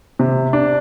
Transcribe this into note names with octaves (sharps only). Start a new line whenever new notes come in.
C3
D4